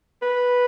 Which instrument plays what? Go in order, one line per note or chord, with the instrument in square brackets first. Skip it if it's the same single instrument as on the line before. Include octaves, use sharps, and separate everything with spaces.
[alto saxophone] B4